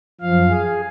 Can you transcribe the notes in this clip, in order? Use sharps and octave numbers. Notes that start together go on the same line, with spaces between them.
F#2 F3 F5
G#4